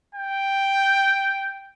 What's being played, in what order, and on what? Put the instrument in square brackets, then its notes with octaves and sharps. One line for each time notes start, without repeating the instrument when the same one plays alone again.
[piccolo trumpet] G5